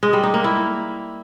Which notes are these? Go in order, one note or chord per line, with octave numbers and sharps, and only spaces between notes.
G#3
G3
D#4
A#3
E4